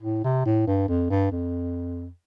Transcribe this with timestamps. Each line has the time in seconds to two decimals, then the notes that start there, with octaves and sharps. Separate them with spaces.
0.02 A2
0.24 C3
0.45 A2
0.67 G2
0.88 F2
1.10 G2
1.32 F2